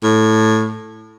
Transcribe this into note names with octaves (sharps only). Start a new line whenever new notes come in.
A2